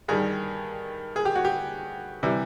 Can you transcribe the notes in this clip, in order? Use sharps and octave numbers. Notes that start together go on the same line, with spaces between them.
G2 D#3 G3 G#4
G#4
G4
F#4
G4
C3 E3 G3